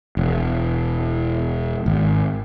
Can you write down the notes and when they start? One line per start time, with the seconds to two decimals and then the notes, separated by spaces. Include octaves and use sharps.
0.17 E1
1.86 G#1